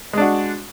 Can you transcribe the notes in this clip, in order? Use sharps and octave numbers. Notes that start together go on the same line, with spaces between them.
G#3 D4 F#4